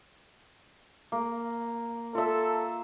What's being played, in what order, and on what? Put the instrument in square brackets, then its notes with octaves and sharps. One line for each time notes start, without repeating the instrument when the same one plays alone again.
[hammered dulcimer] A#3
[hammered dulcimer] F4 E5 [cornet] A4